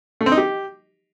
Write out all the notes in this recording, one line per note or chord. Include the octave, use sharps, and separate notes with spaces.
A3
C4
D#4
G4